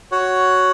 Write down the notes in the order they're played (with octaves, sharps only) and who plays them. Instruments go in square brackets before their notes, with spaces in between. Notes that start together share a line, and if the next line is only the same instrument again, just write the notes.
[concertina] F#4 C#5 F#5